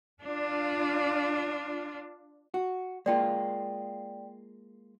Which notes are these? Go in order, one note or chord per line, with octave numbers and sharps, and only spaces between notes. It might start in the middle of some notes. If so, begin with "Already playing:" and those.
D4 F4
F#4
G#3 A#3 F4 D5 G5